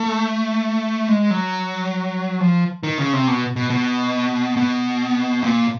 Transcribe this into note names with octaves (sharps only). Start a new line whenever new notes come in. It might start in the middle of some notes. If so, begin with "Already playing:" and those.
Already playing: A3
G#3
F#3
F3
D#3
C#3
C3
B2
B2
B2
B2
A#2